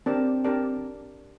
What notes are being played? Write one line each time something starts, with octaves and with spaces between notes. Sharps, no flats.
C4 D4 G4 A#4 D5 A5
D4 G4 A#4 D5 A5